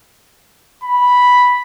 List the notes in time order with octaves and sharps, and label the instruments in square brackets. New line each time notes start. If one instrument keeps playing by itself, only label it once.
[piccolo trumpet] B5